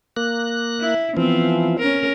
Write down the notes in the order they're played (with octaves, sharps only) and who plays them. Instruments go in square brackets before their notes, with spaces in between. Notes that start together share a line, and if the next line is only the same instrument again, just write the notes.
[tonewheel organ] A#3 F#6
[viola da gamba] E4
[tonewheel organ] E3 F3 [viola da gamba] B3 C4
[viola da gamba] C#4 A#4